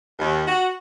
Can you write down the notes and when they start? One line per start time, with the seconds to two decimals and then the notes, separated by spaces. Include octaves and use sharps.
0.19 D#2
0.47 F#4